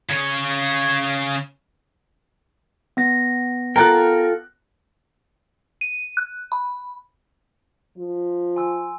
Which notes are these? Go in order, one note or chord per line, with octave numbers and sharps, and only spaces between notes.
C#3 C#5
B3 A#6
F4 A4 A#4 G5 F#6
D#7
F#6
B5
F3
G#5 C6 E6